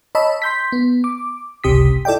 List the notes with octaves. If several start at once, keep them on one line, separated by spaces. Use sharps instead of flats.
C#5 D#5 A5 B5 E6
C6 G6 B6
B3
D6
G1 C#2 C3 G4 D#6 B6
E4 A4 D5 D#5 G5